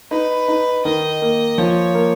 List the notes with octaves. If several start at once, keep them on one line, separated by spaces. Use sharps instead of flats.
D#4 B4
D#4
D#3 D#5
A#3
F3 C#5
A#3